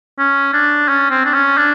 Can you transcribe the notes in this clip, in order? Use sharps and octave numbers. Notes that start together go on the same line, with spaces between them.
C#4
D4
C#4
C4
D4
C#4
D4